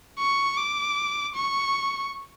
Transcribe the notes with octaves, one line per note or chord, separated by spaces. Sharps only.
C#6
D6
C#6